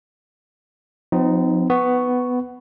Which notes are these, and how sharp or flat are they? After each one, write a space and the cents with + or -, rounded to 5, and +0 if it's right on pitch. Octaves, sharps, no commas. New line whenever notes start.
F3 +30 C4 -40 D#4 +0
B3 +10 C#6 +0